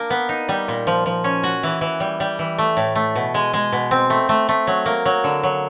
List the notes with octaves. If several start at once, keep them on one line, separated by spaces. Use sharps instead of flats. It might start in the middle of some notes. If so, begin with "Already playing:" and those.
Already playing: A#3 D4
B3
D#4
G3
A#2
F3
F3
C#4
F#4
E3
E3
G3
G3
E3
A3
A2
A3
B2
G#3
G#3
B2
C4
A3
A3
A3
F#3
A#3
F#3
D3
F#3